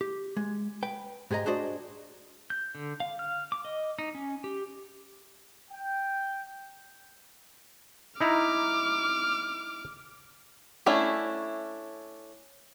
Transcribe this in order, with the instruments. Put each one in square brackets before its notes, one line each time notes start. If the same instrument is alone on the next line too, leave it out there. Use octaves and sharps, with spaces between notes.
[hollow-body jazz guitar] G4
G#3
B4 G5
G#2 G4 G#4 B4 D#5 A#5
D4 F#4 G#4 C5 D5 D#5
[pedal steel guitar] G6
D3
F5
F6
D6
D#5
D#4
C#4
G4
[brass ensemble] G5
[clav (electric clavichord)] D#4 E4 A#5 [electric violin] D6 F6
[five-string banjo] A3 C#4 D4 E4